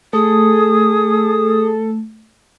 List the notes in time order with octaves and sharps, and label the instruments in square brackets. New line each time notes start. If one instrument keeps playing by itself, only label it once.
[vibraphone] A3 [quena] G#4 [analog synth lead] A4 [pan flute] D#6